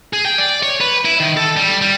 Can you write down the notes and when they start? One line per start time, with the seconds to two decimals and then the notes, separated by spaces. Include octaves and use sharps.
0.13 G#4
0.25 G5
0.38 D5
0.63 C#5
0.81 B4
1.05 E4
1.20 D#3
1.37 A4
1.57 G3
1.82 G3